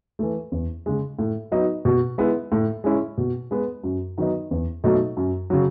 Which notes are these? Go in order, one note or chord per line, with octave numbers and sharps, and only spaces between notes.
E3 A3
E2
C#3 G#3
A2
F#3 B3 D#4
B2
G#3 B3 E4
A2
G#3 C#4 E4
B2
G#3 B3
F#2
D#3 F#3 B3 D#4
E2
B2 F#3 A3 D#4
F#2
C#3 F#3